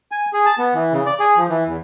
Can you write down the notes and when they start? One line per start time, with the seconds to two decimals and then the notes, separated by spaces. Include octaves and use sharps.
0.12 G#5
0.33 G#4
0.46 A5
0.58 B3
0.75 E3
0.93 C#3
1.06 D5
1.20 G#4
1.37 F3
1.49 E3
1.67 E2